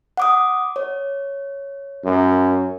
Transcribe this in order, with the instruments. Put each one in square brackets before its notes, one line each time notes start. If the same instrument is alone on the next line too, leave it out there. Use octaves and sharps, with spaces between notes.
[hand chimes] F#5 D6 D#6
C#5
[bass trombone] F#2